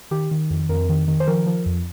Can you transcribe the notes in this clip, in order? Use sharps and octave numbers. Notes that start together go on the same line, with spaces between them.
D#3 G4
D#3
F2
F2 A#4
D#3
D#3
C5
F3 A#4
F3
F2